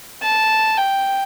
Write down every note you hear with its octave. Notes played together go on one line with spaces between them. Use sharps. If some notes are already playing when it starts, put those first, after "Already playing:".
A5
G5